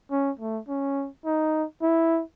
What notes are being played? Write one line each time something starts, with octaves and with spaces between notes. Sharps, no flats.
C#4
A3
C#4
D#4
E4